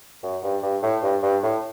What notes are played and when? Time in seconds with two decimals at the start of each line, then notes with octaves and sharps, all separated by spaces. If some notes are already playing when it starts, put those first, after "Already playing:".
0.23 F#2
0.43 G2
0.63 G2
0.83 A2
1.03 G2
1.23 G2
1.43 A2